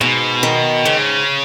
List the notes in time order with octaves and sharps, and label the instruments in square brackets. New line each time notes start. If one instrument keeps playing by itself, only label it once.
[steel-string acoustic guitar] G#2 [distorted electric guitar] B2
[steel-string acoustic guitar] D#3
[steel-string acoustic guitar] G#2 [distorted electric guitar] C#3